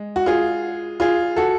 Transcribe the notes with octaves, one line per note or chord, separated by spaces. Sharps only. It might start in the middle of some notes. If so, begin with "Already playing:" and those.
Already playing: G#3
F#4
F4 G#4
F4 G#4
F#4 A4